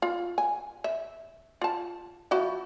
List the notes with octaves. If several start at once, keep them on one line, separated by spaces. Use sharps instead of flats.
F4
G#5
E5
F4 A5
F3 E4 F#4